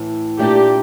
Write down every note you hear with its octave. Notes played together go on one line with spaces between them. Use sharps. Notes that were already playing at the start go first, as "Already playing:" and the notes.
Already playing: A2 E3
A#2 A3 D4 G4